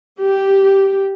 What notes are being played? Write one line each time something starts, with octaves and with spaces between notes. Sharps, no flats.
G4